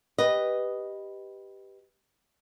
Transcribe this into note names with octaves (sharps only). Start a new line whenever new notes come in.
G4 B4 D#5